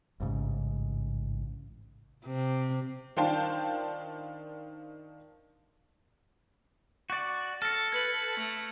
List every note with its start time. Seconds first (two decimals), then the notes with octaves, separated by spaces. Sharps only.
0.20 A1 G#2 C#3
2.26 C3
3.17 D#3 D4 F4 C5 G5 A5
7.10 F#4 D5
7.62 A4 F6 A6 A#6 C#7
7.92 B4 G#6 C#7 F#7
8.36 A3